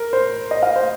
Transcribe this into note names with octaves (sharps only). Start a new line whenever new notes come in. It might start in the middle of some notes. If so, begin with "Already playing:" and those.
Already playing: A#4
C5
D#5
F5
C5